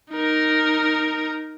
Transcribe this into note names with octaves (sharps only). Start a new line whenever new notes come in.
D#4 A#4